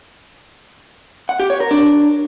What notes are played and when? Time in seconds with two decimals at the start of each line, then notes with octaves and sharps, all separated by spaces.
1.29 F#5
1.40 G4
1.50 C#5
1.60 A#4
1.71 D4